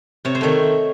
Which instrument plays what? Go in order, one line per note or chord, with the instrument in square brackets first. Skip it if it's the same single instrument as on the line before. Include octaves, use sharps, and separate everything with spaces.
[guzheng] C3 C#5
C5
D#3 A3 C#5